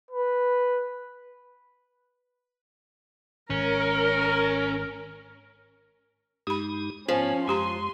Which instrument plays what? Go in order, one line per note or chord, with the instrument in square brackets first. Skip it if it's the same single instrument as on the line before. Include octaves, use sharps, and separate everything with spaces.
[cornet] B4
[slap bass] G#1 [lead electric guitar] C#4 [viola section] A#4
[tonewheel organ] G2 G#3 D#4 [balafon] G4 B5
[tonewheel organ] G#2 B3 [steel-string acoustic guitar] F3 [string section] C#4
[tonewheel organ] F#2 G#3 [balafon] F4 G4 A#5 [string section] C6